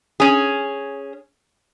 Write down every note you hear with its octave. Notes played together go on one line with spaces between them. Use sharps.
C#4 G#4